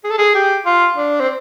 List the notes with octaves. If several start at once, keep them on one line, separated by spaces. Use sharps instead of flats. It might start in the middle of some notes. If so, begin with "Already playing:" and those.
G#4
A4
G#4
G4
F4
D4
C4